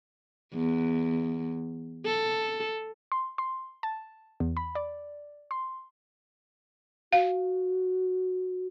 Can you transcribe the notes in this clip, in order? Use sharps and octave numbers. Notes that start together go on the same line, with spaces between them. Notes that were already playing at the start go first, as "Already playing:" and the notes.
E2
A4
C6
C6
A5
E2
B5
D5
C6
F#4 F5